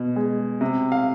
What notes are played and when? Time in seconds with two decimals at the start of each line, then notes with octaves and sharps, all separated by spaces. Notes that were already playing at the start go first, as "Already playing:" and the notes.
Already playing: B2
0.16 G#3
0.61 C3
0.92 F5